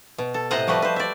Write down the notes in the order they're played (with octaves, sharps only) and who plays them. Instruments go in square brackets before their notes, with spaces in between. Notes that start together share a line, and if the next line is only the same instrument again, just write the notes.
[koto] B2
A4
A2 C3 C5 D#5 F#5 A#5
F3 G3 A3 F#4 B4 D#5
B4 C5
D5 E5